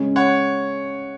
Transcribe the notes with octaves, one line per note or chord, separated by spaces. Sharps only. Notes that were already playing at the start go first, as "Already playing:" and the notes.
Already playing: C#3 G#3 C#4
C#5 F#5